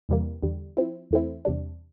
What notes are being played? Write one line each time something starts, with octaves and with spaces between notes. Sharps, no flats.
E2 C3 E3 G3 A#3
E2 D3 G3
F3 C4 E4
E2 E3 A3 C4 E4
E2 C3 G3 D4